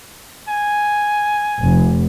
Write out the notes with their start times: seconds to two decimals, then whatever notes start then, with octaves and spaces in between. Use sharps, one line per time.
0.49 G#5
1.59 F1